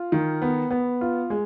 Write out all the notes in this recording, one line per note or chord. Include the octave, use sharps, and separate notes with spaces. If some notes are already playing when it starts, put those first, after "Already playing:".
Already playing: F4
D#3
B3
B3
F4
G#3